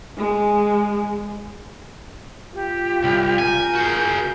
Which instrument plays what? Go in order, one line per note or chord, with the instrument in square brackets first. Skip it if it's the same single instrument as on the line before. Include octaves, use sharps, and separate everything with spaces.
[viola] G#3
[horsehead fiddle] F4 [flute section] G4
[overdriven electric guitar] C2
[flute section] A#4 G6 [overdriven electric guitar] G#5
[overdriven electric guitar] F#4 G#4